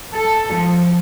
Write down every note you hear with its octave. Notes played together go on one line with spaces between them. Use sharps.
A4
F3